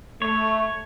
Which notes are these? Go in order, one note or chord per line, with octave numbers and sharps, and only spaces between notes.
A3 C#5